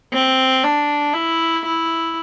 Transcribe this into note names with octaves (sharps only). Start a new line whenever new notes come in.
C4
D4
E4
E4